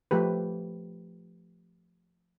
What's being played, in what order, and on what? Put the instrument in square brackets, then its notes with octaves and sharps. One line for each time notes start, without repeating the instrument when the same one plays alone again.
[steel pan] F3 A3 G4 B4